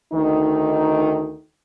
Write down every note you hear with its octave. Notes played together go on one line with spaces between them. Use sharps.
D2 D#3 D#4